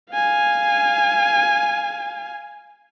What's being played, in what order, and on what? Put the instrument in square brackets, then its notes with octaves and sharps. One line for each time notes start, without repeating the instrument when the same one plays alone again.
[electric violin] F5 G#5